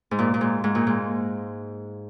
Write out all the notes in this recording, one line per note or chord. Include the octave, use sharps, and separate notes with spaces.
G#2
A#2
A#2
G#2
G#2
A#2
G#2